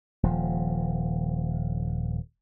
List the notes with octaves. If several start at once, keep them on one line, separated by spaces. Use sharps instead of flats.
D#1 F3